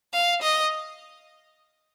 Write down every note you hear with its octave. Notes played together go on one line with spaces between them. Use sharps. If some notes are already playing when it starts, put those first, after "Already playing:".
F5
D#5